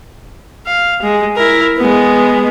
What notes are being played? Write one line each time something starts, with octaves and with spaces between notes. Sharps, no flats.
F5
G#3
E4 A#4
G#3 B3